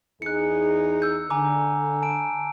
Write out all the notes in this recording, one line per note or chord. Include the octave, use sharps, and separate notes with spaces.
E2 D#4 G#4 F#6 C#7
E6 G6
D3 G#5 A#5 D6
A5 D7